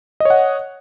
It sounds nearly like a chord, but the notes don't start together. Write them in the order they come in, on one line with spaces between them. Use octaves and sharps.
D#5 C#5 F#5